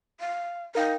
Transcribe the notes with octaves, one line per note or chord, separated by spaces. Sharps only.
F5
D#4 A#4 F5 G5